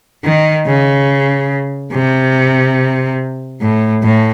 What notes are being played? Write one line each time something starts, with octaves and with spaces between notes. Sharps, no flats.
D#3
C#3
C3
A2
A2